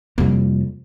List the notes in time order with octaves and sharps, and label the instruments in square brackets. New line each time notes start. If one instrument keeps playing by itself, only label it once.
[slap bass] F2 C3 A#3 [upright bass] G3 E4